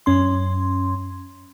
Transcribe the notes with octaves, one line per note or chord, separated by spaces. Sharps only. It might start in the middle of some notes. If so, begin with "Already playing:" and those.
F#2 C#4 C6